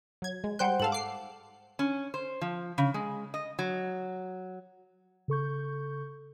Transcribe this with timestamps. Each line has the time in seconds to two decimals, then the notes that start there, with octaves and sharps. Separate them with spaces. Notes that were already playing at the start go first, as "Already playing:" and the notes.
0.22 F#3 G#6
0.44 G#3
0.59 G3 C5 F#5 G5 F#6 G6
0.80 G#2 A4 F5 A5 F#7
0.92 D6 C7
1.79 C#4
2.14 C5
2.41 F3
2.78 C#3
2.94 G#3
3.34 D#5
3.59 F#3
5.28 C#3 A4 C#6 G6